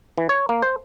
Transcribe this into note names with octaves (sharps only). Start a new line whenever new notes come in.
E3
C#5
A#3
C5